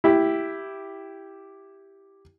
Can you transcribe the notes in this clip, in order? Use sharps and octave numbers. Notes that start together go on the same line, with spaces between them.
E4 G4